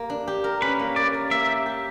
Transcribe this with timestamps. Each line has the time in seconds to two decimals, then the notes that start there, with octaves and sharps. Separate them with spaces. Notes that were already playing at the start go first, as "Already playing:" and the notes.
Already playing: A#3 G4
0.10 D4
0.27 G4
0.44 A#4
0.62 C#4 B4
0.79 A#3
0.96 A#3 D5
1.14 A#4
1.30 A#3 E5
1.48 G4
1.66 G4